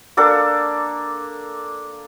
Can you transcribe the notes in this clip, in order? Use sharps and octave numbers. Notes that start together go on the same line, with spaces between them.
A#3 D4 A4 D6